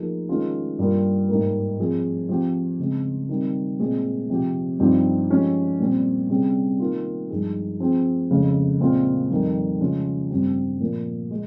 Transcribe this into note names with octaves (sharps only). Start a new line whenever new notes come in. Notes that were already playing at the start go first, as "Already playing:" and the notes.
Already playing: F3 A#3 D#4 G#4
D#3 G#3 C#4 F4 G#4
G2 G3 A#3 F4
G#2 G3 A#3
F3 C4 F4 G#4
F3 C4 G4
C#3 G#3 C4
D#3 G3 C4
A#2 G#3 C4 F4 G#4
C3 F3 C4 G4
G2 F3 C4 D#4 G4
F3 G#3 C#4 G4
A#2 G3 C4
C3 G3 C#4 G#4
D#3 A#3 F4
G2 F3 G#3 D#4 G#4
F3 C4 F4 G#4
F2 C#3 G#3 C#4
A#2 G#3 C4 F4
F2 D#3 G3
C#3 F3 G#3 C#4 F4
G2 G3 C4 G4
A#2 F3 A#3
G#3